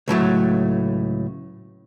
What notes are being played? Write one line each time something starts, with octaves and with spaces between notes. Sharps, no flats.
C#2 A2 F#3 A3